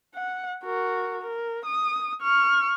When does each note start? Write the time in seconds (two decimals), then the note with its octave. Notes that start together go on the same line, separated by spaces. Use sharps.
0.16 F#5
0.65 F#4 A#4
1.22 A#4
1.65 D#6
2.22 C#6 F6